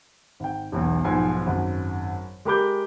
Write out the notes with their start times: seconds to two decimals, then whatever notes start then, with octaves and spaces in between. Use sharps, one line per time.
0.40 G#1 G5
0.72 E1 B1 E2
1.05 B1 G#2 F3 F4 G#5
1.46 G#1 F#2
2.45 G#3 G4 A#4 B5 D6 G6